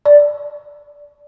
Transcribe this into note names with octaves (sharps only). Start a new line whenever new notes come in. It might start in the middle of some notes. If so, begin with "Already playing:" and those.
D5